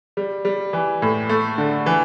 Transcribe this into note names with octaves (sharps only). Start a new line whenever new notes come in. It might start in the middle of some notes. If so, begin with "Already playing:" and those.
G3
G3
E3
A2
A3
D3
E3